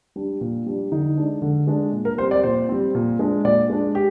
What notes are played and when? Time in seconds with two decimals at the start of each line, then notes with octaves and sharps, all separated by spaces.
0.16 G3 D4
0.41 A#2
0.66 G3 D4
0.92 D3 D#4
1.17 G#3 D4
1.42 D3
1.67 G#3 D4
1.93 A#2
2.05 A#4
2.18 G3 C5
2.22 C4
2.31 D5
2.43 A#2 C5
2.69 G3 C4
2.95 A#2
3.19 G#3 D4
3.45 A#2 D5
3.70 G#3 D4
3.95 G4